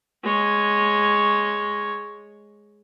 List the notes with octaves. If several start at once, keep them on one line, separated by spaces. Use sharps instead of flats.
G#3 C#5